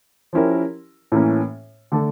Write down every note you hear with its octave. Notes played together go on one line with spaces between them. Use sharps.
F3 C#4 E4 G4 A#4
A2 E3 A#3 C#4
D3 A3 D4 A4